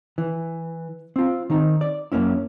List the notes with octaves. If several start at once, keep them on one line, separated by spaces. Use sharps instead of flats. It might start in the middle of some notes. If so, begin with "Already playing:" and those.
E3
C4 F4
D#3 C4 D#4
D5
F#2 C3 A#3 C#4 E4